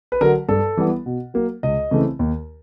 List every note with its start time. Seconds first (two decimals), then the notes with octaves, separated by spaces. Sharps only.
0.12 B4
0.21 D3 F#3 A#4
0.48 G2 A4
0.77 E3 G3 B3
1.06 B2
1.34 F#3 A#3
1.63 C#2 D#5
1.91 C#3 E3 A3 C4
2.19 D#2